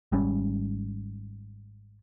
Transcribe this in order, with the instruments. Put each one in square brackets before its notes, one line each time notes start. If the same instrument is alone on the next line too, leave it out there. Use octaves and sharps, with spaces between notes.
[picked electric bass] G#1 G#2 G3 C#4